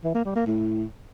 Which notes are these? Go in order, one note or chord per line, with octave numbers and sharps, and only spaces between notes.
E3
A#3
G3
A#3
A2